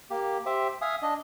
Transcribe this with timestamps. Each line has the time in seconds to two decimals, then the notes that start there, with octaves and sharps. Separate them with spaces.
0.10 A#3 G4
0.46 G4 C5 E5 D6
0.82 E5 F5 G#5 D#6
1.02 D4 D#5